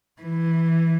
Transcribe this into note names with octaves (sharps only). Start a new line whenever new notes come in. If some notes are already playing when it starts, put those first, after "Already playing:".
E3